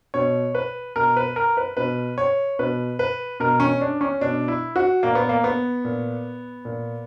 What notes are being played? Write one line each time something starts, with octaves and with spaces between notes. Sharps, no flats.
B2 C#5
B4
B2 A#4
B4
A#4
B4
B2 B4
C#5
B2 B4
B4
B2 A#4
C#4
D4
C#4
B2 D4
E4
F#4
A#2 A#3
B3
A#3
B3
A#2
A#2